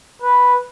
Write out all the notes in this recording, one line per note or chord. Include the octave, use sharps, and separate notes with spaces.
B4